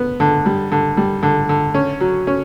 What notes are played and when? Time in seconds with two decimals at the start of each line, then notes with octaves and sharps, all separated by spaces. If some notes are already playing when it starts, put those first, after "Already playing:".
Already playing: B3
0.20 D3
0.46 G3
0.72 D3
0.97 G3
1.23 D3
1.49 D3
1.74 C#4
2.00 F#3
2.27 C#4